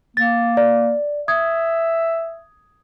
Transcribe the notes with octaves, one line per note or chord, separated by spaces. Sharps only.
A#3 A6
D5
E5 D#6 G#6